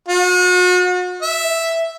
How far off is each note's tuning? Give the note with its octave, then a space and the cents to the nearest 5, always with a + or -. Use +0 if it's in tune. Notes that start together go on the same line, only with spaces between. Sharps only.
F#4 -40
E5 +0